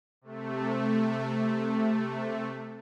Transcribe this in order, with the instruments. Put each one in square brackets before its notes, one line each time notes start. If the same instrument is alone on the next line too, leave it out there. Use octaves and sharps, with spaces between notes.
[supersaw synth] C3 A3